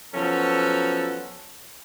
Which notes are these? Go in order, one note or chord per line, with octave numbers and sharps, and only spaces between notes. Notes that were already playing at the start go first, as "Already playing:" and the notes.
F3 F#3 B3 C#4 F#4 A4